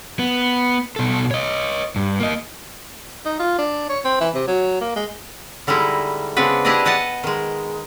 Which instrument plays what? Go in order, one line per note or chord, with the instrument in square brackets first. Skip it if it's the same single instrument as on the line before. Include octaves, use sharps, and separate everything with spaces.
[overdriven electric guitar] B3
B2 A4
C#5 D#5
G2
A#3 D#5
[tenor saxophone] D#4
F4
D4
C#5
C4
E3
C3
F#3
A#3
G#3
[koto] D3 G3 G#3 D#4 E4
C#3 G#3 B3 C4 D4 B4
D4 E4 G4 G#4 D5 D#5
B4 D#5 F#5 A5
D#3 G#3